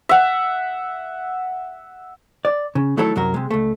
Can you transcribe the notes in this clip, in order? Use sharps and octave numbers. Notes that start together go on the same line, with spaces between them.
E5 F#5
D5
C#3
D#3 F#3 A3 E4 A4 C#5
C2 F#2 F#3 F#4 A#4
C3 G#3
C#2 A3